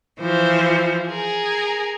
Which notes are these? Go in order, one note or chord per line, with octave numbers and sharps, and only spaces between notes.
E3 F3 C5
G#4 A#4